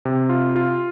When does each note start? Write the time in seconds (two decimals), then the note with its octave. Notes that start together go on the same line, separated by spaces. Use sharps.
0.05 C3
0.29 F4
0.56 F4